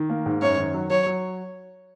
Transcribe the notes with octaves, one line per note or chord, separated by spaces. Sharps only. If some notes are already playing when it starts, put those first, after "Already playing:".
Already playing: D#3
A#3
G#2
F#2 C#5
D#3
F#3
F#3 C#5
F#3